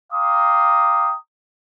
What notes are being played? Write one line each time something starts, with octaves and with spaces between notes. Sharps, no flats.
F5 G5 A#5 C6 D6 D#6